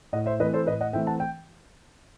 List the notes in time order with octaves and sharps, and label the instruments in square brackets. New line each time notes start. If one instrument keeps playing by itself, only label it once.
[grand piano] A2 D#5 F#5
C5 E5
E3 A3 C4 B4 D#5
A4 C5
A2 B4 D#5
D#5 F#5
E3 A3 C4 E5 G5
F#5 A5
G5